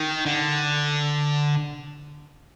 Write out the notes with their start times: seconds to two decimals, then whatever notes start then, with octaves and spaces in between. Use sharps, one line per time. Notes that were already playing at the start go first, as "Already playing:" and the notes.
Already playing: D#3
0.26 D3